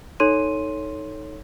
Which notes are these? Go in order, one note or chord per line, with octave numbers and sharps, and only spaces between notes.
D#4 A4 C#5 C6 D#7